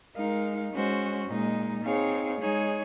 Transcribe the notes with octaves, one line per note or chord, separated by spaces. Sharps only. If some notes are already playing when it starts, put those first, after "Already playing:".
G#3 D#4 A#4 F5
G#3 C#4 F#4 C5
A#2 G#3 D#4
C4 D#4 G#4 C#5 F5
G#3 D#4 G#4 C#5